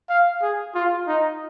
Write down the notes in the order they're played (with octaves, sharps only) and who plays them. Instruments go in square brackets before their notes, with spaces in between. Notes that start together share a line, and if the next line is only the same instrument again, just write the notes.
[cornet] F5
G#4
F4
D#4